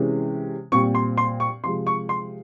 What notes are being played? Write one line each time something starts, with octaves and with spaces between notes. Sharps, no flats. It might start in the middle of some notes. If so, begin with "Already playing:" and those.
Already playing: C3 E3 G#3 C#4
A#2 G3 C4 C#6
C6
C6
C#6
C3 F3 G#3 C6
C#6
C6